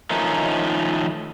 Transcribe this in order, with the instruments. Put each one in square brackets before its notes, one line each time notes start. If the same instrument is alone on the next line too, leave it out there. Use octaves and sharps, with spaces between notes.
[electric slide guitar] D#3 F3 A3 C#4 D#4